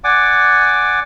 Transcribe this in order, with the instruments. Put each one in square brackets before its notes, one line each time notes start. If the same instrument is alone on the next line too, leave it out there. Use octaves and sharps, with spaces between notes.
[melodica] D5 F#5 G#5 D6